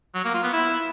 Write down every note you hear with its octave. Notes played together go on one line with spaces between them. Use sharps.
F#3
A#3
F4
B3
E4